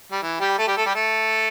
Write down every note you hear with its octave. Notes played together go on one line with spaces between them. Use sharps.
G3
E3
G3 G4
A3 A4
G3 G4
A3 A4
G3 G4
A3 A4